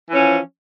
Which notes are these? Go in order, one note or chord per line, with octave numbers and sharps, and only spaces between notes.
E3 F3 C#4